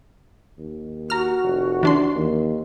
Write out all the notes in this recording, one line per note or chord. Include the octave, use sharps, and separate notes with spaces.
D#2
F#4 A#5 F6
F1
E3 D4 C6
D#2